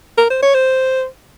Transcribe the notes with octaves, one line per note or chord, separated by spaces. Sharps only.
A#4
C5
C#5
C5